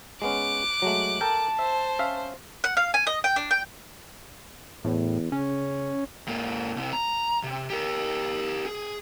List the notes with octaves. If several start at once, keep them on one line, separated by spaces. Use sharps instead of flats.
G#3 B3 C#4 D6 F#6
F#3 G#3 A3
A4 A#4 G5 A5
C5 E5
C#4 E5 F5
F#5
F5
G#5
D#5
G5
D4
G5
E2 A2
C#3 C#4
G#2 A#3
C2 C3
A#5
C3
G4 A#4
G#4